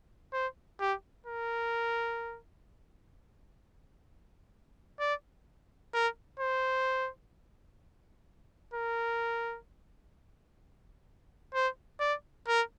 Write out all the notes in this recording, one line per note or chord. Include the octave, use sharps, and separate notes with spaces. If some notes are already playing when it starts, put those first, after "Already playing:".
C5
G4
A#4
D5
A#4
C5
A#4
C5
D5
A#4